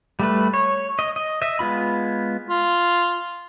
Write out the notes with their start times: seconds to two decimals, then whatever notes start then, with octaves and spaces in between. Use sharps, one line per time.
0.19 G3 A3 B4
0.54 C#5
0.99 D#5
1.16 D#5
1.42 D#5 E5
1.59 G#3 B3 F4 B5
2.49 F4